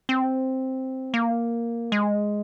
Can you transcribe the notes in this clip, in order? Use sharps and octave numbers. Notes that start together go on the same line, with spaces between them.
C4
A#3
G#3